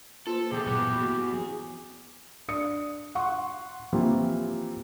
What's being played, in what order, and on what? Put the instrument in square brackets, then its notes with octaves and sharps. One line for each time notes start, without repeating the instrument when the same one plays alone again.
[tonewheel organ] A#3 B4 C5 [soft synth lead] F4 [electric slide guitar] A4
[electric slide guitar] B2 E3 [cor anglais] G4 [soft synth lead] G#4
[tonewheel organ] G2 A#2 F#3 [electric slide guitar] E3 B3 [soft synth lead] B4
[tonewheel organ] A#3 [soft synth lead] F#4
[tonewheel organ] F3 C4 [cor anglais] G#4
[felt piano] D4 D#6 C#7
F#5 C6 C#6
E3 F3 A#3 C4 F4 G4